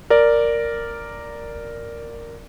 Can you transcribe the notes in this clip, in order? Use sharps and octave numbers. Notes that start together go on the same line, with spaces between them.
A#4 D5